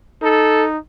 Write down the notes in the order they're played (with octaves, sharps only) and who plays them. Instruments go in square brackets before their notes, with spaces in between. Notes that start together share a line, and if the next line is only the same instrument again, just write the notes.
[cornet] D#4 [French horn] A4